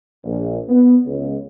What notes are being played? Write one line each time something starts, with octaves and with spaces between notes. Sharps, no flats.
A#1
B3
C#2